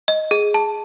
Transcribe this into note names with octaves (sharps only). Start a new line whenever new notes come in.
D#5
G#4
A5